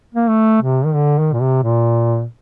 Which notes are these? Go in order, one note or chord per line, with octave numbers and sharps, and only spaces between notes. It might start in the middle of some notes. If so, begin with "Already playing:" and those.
A#3
A3
C3
D#3
D3
D#3
A#2
C3
A#2